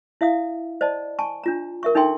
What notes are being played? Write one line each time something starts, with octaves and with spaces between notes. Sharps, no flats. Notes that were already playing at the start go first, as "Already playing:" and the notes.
E4 E5 F5 D#6
C5 D5 D#5 A5
G#5 A5 C#6
D4 F4 A#5
A#4 E5 C#6
D4 D#4 A4 E5 G5 C6